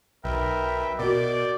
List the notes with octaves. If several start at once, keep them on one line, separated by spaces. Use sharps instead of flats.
B1 A#4 B4 E5 G5
B2 F#4 A#4 D5 D6 G6